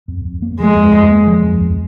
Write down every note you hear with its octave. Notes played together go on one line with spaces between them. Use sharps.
F2
F2
A#3
F3 G#3
F2
F2
A#3
F3
F2
F2